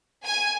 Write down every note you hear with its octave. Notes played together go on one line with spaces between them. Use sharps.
G#5